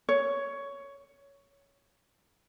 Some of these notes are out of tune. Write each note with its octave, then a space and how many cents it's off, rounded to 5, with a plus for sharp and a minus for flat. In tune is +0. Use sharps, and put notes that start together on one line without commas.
C#5 +10